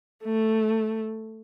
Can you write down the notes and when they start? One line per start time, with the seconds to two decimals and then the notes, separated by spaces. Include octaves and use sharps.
0.24 A3